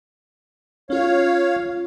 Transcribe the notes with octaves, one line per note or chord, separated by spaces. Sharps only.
C#4 F4 C#5 F5